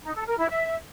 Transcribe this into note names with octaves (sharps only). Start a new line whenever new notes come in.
D#4
A4
A#4
E4
E5